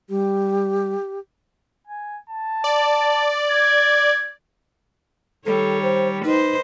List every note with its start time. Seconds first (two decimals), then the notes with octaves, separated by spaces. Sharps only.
0.10 G3 G4
1.87 G#5
2.30 A5
2.64 D5
3.51 G#6
5.46 D#3 G3 A4 C#5
5.83 C5
6.24 D#4 B4 C5 D#5